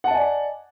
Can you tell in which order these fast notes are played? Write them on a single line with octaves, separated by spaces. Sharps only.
F#5 A5 D#5 G#5 D5